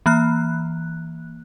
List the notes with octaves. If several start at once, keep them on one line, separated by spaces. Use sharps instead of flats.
E3 A#3 F#6